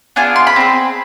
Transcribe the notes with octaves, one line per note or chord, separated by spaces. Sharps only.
B3 D4 F4 G#4 G#5
C6
B5
C4 G#4